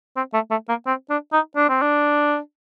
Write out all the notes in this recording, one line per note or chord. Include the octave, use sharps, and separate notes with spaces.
C4
A3
A3
A#3
C4
D4
D#4
D4
C4
D4